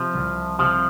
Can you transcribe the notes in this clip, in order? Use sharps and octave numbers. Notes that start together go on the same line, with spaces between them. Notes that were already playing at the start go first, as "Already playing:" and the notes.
Already playing: C3 F3
C2
C3 F3